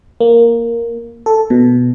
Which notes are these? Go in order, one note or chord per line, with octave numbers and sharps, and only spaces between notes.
A#3
A4
B2